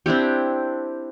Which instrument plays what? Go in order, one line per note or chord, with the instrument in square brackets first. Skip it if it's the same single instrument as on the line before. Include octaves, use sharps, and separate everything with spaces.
[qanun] C4 D4 E4 G4